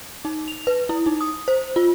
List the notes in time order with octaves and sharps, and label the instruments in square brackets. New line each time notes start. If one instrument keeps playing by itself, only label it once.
[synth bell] D#4
F7
B4
E4
D#4
D#6
C5
F4